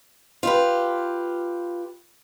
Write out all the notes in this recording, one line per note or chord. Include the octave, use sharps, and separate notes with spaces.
F4 G4 B4